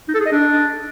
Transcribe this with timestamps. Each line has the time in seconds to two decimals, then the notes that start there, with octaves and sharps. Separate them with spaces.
0.08 D#4
0.14 A4
0.20 G#4
0.26 D#5
0.32 D4